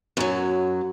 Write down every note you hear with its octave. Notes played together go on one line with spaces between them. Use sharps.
F#2 F#3